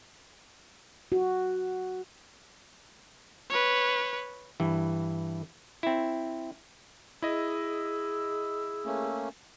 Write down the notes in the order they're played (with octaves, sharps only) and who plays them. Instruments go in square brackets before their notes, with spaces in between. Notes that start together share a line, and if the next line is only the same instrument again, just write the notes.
[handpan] F#4
[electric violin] B4 C#5
[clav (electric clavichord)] G2 E3
C4 E4
[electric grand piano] E4 D#5 [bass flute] G#4 [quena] E6
[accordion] A3 A#3 C#4